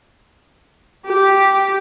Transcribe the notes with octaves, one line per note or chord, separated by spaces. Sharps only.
G4